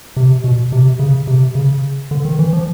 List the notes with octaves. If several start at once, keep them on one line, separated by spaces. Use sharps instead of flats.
C3
B2
C3
C#3
C3
C#3
D3
D#3
E3
F3